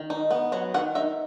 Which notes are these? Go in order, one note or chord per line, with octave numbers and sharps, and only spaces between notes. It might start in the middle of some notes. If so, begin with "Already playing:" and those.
Already playing: D#3
D#4
B3
F#3 F#5
D#3 F#5
D#4 E5